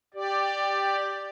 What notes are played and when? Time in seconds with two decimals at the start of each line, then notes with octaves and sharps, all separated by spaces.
0.14 G4 D5